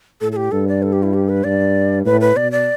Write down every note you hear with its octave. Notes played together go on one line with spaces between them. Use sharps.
A2 A4
A4
G4
G2 A4
D5
A4
G4
E4
G4
B4
G2 D5
A2 B4
B4
B2 D5
D5